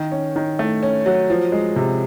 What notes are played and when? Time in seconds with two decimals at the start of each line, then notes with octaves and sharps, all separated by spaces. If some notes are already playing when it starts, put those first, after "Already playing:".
Already playing: D#3
0.12 C#4
0.36 D#3
0.59 A3
0.83 C#4
1.06 F#3
1.30 F3
1.52 G#3
1.76 C3